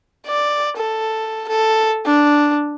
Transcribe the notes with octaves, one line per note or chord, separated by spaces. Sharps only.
D5
A4
A4
D4